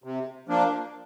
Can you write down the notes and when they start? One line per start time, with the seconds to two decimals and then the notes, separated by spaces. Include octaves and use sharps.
0.04 C3
0.48 F3 A#3 D4